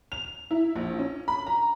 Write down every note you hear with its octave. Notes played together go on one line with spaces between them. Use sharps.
F7
E4
A#1
C#4
B5
A#5